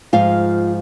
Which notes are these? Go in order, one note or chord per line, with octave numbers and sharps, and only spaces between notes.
G#2 F3 F4 F5